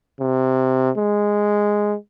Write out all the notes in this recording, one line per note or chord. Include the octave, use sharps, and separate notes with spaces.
C3
G#3